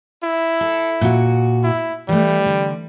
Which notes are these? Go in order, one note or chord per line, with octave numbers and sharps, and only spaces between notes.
E4
A4
A#2 F#4
E4
E3 G3 A3
D3